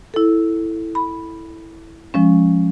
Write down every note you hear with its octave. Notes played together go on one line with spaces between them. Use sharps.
E4 A4
B5
F3 G#3 C#4